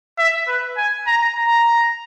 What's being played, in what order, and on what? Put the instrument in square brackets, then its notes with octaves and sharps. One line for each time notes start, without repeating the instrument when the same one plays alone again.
[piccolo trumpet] E5
B4
G#5
A#5
A#5